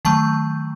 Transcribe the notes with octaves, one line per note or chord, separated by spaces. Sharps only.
D#3 F#3 A3 A5